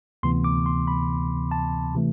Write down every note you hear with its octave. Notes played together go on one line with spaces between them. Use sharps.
D2 C3 E3 B3 C6
D6
C6
B5
A5
C3 E3 A3